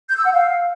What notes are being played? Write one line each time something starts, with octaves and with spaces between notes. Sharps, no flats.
G6
E6
F#5
F5